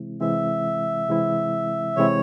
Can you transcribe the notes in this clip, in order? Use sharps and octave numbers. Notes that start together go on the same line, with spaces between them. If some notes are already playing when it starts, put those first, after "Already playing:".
Already playing: C3 E3 G#3 C4 E4
C3 E3 G#3 C4 E4 E5
C3 E3 G#3 C4 E4
C3 E3 G#3 C4 E4 C#5